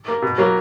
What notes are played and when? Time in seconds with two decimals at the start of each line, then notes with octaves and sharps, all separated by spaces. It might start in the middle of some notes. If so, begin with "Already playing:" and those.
0.08 A#3
0.22 B2
0.38 F#3 A#3